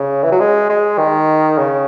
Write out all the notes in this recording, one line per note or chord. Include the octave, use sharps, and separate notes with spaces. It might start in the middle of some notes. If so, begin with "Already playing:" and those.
Already playing: C#3
E3
F#3
G#3
G#3
D#3
C#3